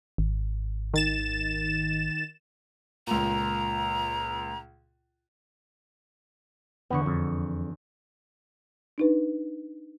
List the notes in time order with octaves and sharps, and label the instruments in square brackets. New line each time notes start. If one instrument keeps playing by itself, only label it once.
[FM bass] G#1
[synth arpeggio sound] D#3 A6 E7
[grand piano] C#2 A#2 [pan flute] A#5
[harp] E2 D3 C#6 [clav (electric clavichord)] B3
[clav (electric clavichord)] F2
[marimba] D4 D#4 B4